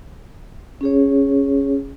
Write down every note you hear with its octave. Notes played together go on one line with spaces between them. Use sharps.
C#4 G#4 C#5